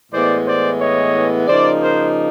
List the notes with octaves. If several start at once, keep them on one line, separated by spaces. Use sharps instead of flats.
A2 E3 G#3 B3 C5 D5
C5 D5
C#5 D#5
C#3 F3 A#3 D#4 C5 D5
A#4 C5